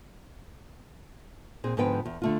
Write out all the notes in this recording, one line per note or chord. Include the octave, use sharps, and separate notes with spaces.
A#2 C4 G#4
G#2 D3 F3 B3 B4 G5
E2
D3 A3 F4